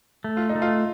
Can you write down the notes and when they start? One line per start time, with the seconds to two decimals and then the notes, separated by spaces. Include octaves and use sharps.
0.24 A3
0.37 F4
0.49 D#4
0.55 A3
0.62 F4